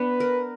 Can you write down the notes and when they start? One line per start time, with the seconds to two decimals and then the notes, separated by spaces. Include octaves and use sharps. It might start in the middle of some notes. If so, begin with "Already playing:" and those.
Already playing: B3 D4 B4
0.20 A#4